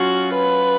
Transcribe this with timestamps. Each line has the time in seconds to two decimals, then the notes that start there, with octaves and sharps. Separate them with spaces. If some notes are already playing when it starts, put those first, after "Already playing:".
Already playing: F#3 C#4 F4 F#4
0.34 B4